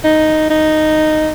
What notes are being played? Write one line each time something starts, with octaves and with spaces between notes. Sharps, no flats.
D#4
D#4